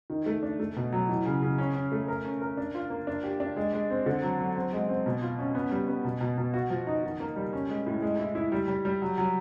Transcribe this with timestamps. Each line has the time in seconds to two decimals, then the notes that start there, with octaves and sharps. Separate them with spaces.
0.10 D#3
0.26 A3
0.43 D4
0.60 A3
0.76 B2
0.93 F#3
1.09 E3
1.25 C#3
1.42 C#3
1.58 C#4
1.75 C#4
1.92 A3
2.08 A#4
2.25 C#4
2.42 A#4
2.57 D4
2.75 F4
2.90 A#3
3.07 D4
3.24 G4
3.40 D4
3.56 G#3
3.73 G#3
3.90 C4
4.06 D3
4.22 F#3
4.39 F#3
4.56 C4
4.73 G#3
4.89 C4
5.06 B2
5.22 F4
5.39 C#4
5.55 B3
5.72 G3
5.88 B3
6.04 B2
6.21 B2
6.38 B2
6.54 F#4
6.70 F3
6.87 D#4
7.03 D#3
7.20 A#3
7.36 G3
7.53 C#4
7.69 G#3
7.86 A2
8.02 G#3
8.19 E4
8.35 E4
8.52 G3
8.68 G3
8.85 G3
9.02 F#3
9.18 F#3